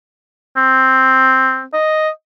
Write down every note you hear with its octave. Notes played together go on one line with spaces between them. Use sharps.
C4
D#5